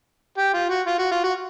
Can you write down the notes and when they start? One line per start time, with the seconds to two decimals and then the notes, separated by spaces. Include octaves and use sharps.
0.38 G4
0.54 F4
0.70 F#4
0.87 F4
0.99 F#4
1.12 F4
1.24 F#4